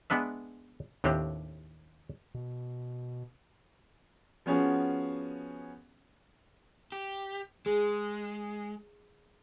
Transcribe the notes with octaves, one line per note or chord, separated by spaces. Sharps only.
G#3 B3 D4 B4 E5
D#2 A2 C4 D4 G4
B2
F3 B3 C#4 F#4 G#4
G4
G#3 G#4